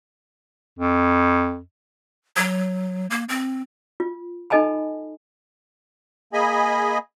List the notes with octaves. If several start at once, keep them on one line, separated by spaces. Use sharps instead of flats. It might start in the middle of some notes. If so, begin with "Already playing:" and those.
F2
F#3
A#3
C4
F4
D#4 A4 D#5 G#5 A5 B5
A#3 G#4 D#5 G#5 B5